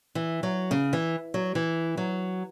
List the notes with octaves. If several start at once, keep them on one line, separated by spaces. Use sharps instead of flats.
E3
F#3
C#3
E3
F#3
E3
F#3